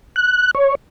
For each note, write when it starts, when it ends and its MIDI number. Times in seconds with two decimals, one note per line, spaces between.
0.16 0.51 90
0.55 0.75 73